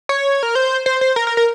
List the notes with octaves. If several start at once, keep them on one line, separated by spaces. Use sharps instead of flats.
C#5
A#4
C5
C5
C5
A#4
A#4
A#4